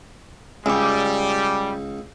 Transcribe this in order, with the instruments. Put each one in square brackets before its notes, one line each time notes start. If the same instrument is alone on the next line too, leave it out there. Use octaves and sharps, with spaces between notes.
[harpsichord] C#2 [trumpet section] G3 [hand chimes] G#5 D6